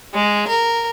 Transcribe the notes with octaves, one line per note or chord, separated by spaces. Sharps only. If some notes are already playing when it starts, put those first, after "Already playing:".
G#3
A#4